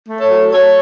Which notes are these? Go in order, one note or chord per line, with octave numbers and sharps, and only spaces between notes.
A3
A4 C#5
F#3
F#3 A4 C#5